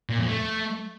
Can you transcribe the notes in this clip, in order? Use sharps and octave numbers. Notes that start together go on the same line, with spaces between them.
A#2
F2
A3